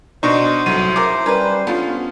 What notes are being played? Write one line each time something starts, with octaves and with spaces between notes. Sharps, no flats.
B2 D4 D#4 C5 C#6
C2 A2 F#3 D#7
C#3 E4 A#4 D6
G3 C#4 A#4 B4
D3 F3 B3 C#4 F4